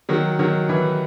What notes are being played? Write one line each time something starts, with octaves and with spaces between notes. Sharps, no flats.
D#3 F#3
D#3 F#3
E3